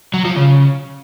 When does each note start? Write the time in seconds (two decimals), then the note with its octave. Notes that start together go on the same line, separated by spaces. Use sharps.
0.14 F#3
0.25 F3
0.36 C#3